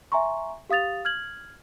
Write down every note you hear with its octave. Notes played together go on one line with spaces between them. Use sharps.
E5 G#5 A#5 C6 C#6
G4 F5 D#6 A6 F7
F6 G#6 F#7